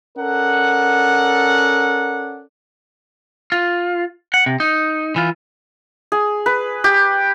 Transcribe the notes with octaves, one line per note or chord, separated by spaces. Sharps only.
C#4 A4 A#4 D5 F#5
F4
F#5
C3
D#4
E3 F4
G#4
B4
G4